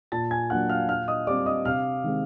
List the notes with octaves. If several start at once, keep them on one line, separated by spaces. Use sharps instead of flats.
A#2 A5 A6
G#5 G#6
F#3 A#3 D4 F#5 F#6
F5 F6
A#2 F5 F6
D#5 D#6
G3 C4 D5 D6
D#5 D#6
C3 F5 F6
D#3 G#3 C4